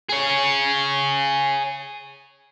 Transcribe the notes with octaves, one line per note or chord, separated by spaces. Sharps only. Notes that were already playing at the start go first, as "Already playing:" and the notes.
G#4 C#5